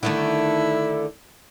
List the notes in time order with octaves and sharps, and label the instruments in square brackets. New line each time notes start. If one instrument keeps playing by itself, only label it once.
[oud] D3 D#3 A3 [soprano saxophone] E4